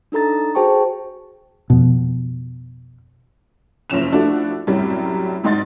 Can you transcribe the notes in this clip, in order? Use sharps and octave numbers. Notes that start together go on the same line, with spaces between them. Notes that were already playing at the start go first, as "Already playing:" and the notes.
D4 D#4 A4 A#5 A6
F#4 G#4 C5 G5 A5 C#6
F2 B2
F#1 F3 C#4 E7 F7
F3 A3 D4 E4 F#4
F#2 A2 C3 F#3 G3
G#1 G#2 D#4 C6 A6